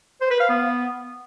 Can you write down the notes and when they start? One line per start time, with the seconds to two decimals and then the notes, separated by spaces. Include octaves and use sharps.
0.21 C5
0.30 B4
0.40 F5
0.49 B3